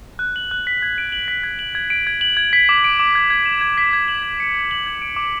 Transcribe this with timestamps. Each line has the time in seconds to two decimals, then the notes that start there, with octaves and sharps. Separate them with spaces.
0.19 F#6
0.36 F#7
0.51 F#6
0.67 B6
0.82 G#6
0.98 D7
1.12 F#7
1.28 B6
1.43 G#6
1.59 F#7
1.75 G#6
1.90 D7
2.07 G#6
2.21 F#7
2.37 G#6
2.53 B6
2.69 D6
2.84 D7
3.00 D6
3.15 G#6
3.30 G#6
3.45 E7
3.61 G#6
3.78 B6
3.93 G#6
4.08 F#7
4.23 G#6
4.40 C#7
4.55 G#6
4.71 F#7
4.87 G#6
5.02 D7
5.16 D6